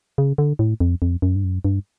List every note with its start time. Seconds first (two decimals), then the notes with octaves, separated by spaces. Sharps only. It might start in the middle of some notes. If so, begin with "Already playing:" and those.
0.18 C#3
0.38 D3
0.59 A2
0.80 F2
1.02 F2
1.22 F#2
1.36 G2
1.44 F#2
1.65 G2